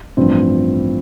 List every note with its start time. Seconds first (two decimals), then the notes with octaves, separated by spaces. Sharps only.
0.17 A1 G2 F3 C4